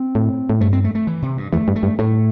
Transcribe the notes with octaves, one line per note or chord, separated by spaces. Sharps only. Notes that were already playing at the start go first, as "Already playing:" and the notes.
Already playing: C4
A2
A2
G2 A3
C4
A3
A3
E3
C3
G2
E2 A3
G2
A3
G2
A2 A3